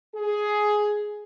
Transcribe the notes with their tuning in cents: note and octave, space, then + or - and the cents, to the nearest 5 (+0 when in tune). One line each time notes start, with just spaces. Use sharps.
G#4 +10